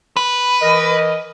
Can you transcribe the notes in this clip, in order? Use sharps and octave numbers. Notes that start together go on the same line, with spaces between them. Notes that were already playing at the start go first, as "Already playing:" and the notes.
B4
E3 A#4 D#5